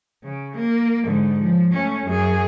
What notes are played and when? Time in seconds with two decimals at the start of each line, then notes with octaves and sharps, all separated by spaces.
0.24 C#3
0.57 A#3
1.06 G#2 D3
1.39 F3
1.72 A3 C#4
2.06 F#2 G#4